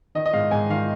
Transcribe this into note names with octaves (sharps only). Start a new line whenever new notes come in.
D#3 D#5
D#5
G#2 F5
G#2 G#5
D#3 F5